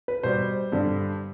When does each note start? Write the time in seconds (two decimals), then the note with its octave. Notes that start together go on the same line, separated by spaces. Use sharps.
0.08 B4
0.23 B2 G3 C5
0.72 G2 D3 G3